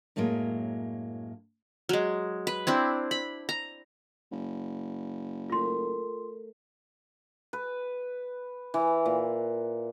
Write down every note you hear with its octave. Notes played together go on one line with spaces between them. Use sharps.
F#2 A2 F#3 G#3 A#3
F#3 G#3
B4
C4 D4 E4
B5
A#5
F#1
A3 F4 A#4 C6
B4
E3
A#2